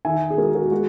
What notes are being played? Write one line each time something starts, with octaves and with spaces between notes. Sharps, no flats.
D#3 E5 G#5
G#4
G#3 F#4 A#4
F#4 A#4
G#3 F#4